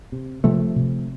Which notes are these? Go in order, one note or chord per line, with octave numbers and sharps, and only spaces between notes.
C3
C3 F3 A3
C3